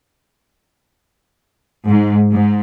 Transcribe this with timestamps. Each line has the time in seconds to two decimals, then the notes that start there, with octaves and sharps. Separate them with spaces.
1.87 G#2
2.29 G#2